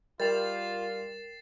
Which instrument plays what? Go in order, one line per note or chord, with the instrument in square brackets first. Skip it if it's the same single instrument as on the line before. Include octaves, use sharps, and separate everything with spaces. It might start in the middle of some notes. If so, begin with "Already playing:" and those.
[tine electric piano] G3 [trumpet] F4 [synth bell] A#4 G5 F7 [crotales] A6 C7 E7